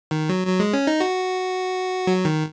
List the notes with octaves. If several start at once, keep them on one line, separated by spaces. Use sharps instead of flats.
D#3
F#3
F#3
G#3
C#4
D#4
F#4
F#3
D#3